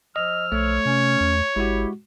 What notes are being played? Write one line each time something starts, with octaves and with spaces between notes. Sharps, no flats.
F3 D#5 E6 F6
B1 A3 C#5
C3 C#4
E2
G#1 G#3 E4 F#4 G4